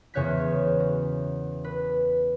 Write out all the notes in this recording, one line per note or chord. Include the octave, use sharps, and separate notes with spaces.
E2 C#3 C#5 F#6 G6 B6
F#4
B4